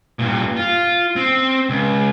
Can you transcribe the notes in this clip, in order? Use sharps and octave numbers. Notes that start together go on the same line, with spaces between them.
G2 A#2
F4
C4
C#2